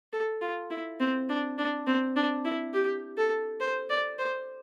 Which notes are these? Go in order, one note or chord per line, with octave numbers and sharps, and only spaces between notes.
A4
F4
E4
C4
D4
D4
C4
D4
E4
G4
A4
C5
D5
C5